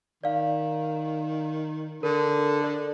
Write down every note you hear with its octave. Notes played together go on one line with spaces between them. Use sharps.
D#3 D5 F5
D3 A#4
A4 D5